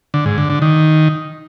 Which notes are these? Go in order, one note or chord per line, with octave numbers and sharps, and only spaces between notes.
D3
G#2
D3
D3
D#3